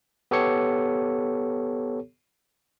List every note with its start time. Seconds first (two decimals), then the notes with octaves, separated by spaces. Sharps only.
0.31 B3 G4 A4 C#5 C#7